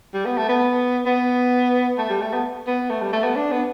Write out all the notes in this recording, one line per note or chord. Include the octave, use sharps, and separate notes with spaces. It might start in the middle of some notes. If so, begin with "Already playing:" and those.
G3
B3
A3
B3
B3
A3
G3
A3
B3
B3
A3
G3
A3
B3
D4
B3